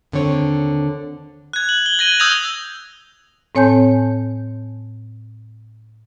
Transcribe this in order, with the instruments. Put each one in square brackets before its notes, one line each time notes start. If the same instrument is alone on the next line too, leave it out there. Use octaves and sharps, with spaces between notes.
[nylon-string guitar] D#2 D3 C4 C#5
[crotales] F#6 G#6
F#7
G7
G#6 A#6 D#7 G7
D#6 E6 G6 G#6 A#6 F7
[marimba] A2 C4 C#5 G#5 A5 G6